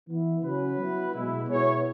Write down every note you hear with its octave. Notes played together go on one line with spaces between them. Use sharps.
E3 B3 E4
C#3 F#3 C#4 F#4 B4
F#3 B3 E4
B2 G#3 E4
B2 B3 E4 G#4 C#5